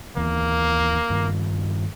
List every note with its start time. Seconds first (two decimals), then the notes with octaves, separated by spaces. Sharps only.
0.17 D#2 E3 A#3
1.10 G2 D#3